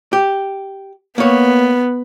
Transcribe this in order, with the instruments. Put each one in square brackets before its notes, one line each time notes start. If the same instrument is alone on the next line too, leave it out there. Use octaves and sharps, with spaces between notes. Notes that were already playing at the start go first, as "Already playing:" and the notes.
[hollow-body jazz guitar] G4
[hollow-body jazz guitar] A#3 C#5 [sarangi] B3